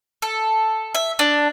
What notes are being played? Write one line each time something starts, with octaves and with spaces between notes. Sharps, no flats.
A4
E5
D4